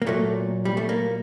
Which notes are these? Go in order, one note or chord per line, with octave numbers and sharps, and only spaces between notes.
A#3
A#2 F#3 A3
G3
A3
A#3